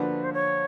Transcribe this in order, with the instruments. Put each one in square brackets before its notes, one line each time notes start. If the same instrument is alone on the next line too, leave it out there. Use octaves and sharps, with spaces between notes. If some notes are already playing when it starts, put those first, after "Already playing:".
Already playing: [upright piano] D3 F3 A#3 D4 F#4 [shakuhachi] B4
[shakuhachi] C5
C#5